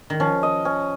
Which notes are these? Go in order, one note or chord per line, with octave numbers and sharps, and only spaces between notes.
D#3
F3 C#4
D#5
C#4